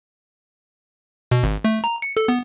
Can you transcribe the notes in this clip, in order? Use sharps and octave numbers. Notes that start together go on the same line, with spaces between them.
B2
G#1
A3
A#5
C#7
A4
B3